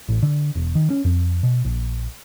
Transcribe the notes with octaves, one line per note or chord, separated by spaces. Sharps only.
A1
D3
E1
D#3
C#4
F2
B2
A#1